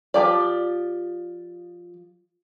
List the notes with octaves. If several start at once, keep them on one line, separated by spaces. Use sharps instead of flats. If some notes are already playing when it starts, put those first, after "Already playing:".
F3 G4 D5